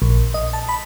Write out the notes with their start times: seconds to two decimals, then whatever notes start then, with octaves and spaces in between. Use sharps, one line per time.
0.02 A#1
0.34 D#5
0.53 A5
0.69 B5